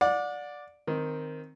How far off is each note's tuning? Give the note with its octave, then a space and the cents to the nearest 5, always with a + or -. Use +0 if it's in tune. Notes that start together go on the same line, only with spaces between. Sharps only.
D5 +0 F#5 -35
D#3 +0 C4 +0